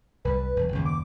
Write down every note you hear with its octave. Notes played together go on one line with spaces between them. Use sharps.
C2 G3 B4
E1
F#1 D#2 C#3
D6